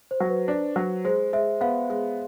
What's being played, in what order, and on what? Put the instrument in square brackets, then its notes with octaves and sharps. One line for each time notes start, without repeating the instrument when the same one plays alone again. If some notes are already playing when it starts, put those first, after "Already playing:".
[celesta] C5
[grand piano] F#3
[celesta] B4
[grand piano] D4
F#3
[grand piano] G#3 [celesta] C5
[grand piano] G#3 [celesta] E5
[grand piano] B3 [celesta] F5
[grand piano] G#3